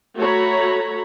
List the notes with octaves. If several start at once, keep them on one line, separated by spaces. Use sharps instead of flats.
A3 F#4 C#5 A#5 B5